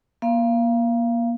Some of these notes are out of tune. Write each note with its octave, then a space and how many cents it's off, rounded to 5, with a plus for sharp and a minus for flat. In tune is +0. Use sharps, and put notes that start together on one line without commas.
A#3 +30 F5 -25